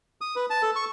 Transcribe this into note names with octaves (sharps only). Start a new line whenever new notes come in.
D#6
B4
A5
A4
C#6